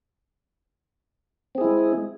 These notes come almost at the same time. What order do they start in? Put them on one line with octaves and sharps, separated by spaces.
C4 G#4 E4 G#3